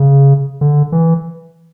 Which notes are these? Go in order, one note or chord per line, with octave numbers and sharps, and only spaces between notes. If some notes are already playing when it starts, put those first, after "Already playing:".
Already playing: C#3
D3
E3